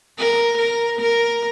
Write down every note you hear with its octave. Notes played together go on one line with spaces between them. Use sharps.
A#4
A#4
A#4